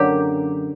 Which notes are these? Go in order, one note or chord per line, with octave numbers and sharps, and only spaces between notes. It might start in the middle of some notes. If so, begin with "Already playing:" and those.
Already playing: F#2 D3 F#3 A#3 G4